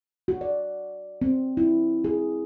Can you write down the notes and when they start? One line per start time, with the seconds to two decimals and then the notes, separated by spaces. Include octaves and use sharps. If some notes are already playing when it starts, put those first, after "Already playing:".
0.28 F#4
0.41 D5
1.21 C4
1.57 E4
2.04 G#4